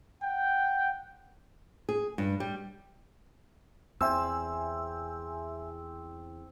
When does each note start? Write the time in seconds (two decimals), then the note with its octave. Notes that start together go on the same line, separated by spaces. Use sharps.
0.22 F#5 G5
1.89 G#4
2.18 G2
2.40 G3
4.01 E2 C4 E5 G#5 E6